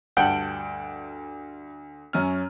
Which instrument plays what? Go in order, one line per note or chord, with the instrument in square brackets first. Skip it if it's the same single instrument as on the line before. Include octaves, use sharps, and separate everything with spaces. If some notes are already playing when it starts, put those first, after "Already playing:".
[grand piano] D2 A5 F#7 [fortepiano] G2 F#5 G5
[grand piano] F#2 C#4 F6